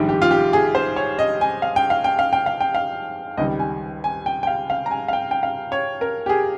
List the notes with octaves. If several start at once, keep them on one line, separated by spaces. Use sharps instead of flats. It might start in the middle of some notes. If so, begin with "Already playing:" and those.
Already playing: A#1 G#2 D#3 G3
G4
F4
G4
G#4
C5
C#5
D#5
G#5
F5
G5
F5
G5
F5
G5
F5
G5
F5
C#2 C3 D#3 G3 D#5
G#5
G#5
G5
G5
F5
F5
A#5
G#5
F5
G5
G5
F5
C#5
A#4
G4
G#4